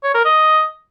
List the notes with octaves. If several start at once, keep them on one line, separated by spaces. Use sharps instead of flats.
C#5
A#4
D#5